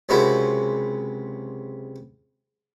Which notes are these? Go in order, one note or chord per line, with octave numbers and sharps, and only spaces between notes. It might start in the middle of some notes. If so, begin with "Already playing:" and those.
C#2 C3 F#3 G#3 E4 A#4